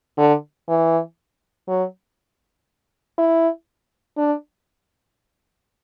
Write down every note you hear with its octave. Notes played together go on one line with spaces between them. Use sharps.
D3
E3
F#3
E4
D4